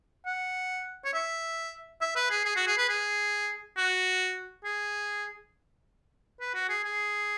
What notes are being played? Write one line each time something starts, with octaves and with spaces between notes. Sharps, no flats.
F#5
C#5
E5
E5
B4
G#4
G#4
F#4
G#4
B4
G#4
F#4
G#4
B4
F#4
G#4
G#4